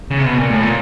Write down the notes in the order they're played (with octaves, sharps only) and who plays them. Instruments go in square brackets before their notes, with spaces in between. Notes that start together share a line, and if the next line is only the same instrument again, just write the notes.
[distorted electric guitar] C#3
C3
B2
A#2
A2
A#2